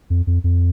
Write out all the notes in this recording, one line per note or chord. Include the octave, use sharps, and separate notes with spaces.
F2
F2
F2